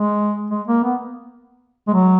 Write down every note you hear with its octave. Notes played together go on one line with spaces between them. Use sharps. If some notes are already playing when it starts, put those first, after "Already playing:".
Already playing: G#3
G#3
A#3
B3
G#3
F#3